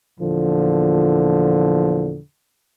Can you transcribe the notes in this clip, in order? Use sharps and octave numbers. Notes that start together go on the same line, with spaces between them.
E2 A#2 D3 F3